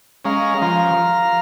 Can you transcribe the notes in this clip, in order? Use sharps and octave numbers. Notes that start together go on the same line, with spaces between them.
G#3 C#4 F5 A#5
F3 F5 A#5